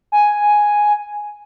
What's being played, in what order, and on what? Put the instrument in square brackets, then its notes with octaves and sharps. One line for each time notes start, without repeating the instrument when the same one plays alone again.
[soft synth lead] G#5